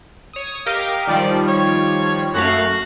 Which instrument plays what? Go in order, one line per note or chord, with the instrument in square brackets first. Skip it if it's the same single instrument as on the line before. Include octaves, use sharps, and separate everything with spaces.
[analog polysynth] C#5 D#6
[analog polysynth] G4 A#4 D#5 [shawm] F5
[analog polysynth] D#3 F3 G3 [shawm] D5
[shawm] C#5
[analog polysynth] F#2 A3 F5 [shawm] F#4